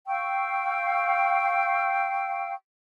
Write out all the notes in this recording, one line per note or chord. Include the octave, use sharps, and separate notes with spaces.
F5 G5 C#6 E6